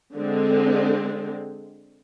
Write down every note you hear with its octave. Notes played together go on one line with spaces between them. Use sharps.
D3 G#3 C4